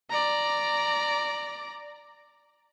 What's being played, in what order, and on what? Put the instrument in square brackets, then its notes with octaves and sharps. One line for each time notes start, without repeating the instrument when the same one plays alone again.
[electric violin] D5 A#5